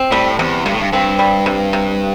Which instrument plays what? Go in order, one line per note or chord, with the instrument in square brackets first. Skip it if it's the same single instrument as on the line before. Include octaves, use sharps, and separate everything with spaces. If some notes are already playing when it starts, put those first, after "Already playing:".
Already playing: [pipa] C4
[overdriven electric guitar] A2 [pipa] G3
[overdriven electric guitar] E2 [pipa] C3
[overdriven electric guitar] G2 [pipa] C3
[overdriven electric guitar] A2
G2
[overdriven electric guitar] G2 [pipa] C4
[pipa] G3
C3
C3